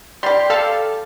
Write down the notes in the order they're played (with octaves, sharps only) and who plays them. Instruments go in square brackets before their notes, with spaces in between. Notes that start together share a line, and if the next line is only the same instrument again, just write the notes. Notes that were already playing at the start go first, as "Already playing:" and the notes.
[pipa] G3 G4 [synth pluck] C6
[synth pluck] A4 F5 A5